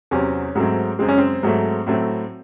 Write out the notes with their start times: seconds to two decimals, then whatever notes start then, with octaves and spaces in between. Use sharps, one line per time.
0.11 E2 C3 F#3 C4 C#4
0.55 G#2 F#3 A3 C4
0.99 F#2 C#3 G#3 C4
1.09 C#4
1.18 C4
1.43 G#2 F#3 A3
1.87 A2 F#3 A3 C4